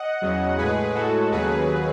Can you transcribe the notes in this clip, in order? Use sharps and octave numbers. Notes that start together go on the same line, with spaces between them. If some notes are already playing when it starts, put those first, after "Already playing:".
Already playing: D#5 F#5
E2 C#3 F#3
A2 G#3 G#4 B4
A2 G#3 F#4 A4
D#2 C#3 F#3 G#4 B4